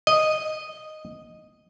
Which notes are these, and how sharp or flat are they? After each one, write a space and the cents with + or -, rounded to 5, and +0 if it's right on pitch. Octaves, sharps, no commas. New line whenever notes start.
D#5 -5